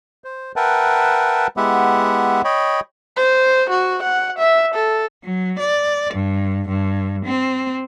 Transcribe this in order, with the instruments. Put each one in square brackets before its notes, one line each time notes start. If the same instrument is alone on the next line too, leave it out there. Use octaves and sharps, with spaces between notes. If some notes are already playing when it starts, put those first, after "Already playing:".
[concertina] C5
A#4 B4 E5 F#5 G5 A5
G#3 B3 E4 G4 E5 F#5
C#5 D#5 G5 B5
[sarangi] C5
F#4
F#5
E5
A4
[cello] F#3
D5
G2
G2
C4